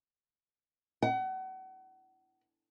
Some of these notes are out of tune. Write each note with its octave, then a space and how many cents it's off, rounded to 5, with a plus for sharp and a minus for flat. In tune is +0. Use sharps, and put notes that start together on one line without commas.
F#5 +35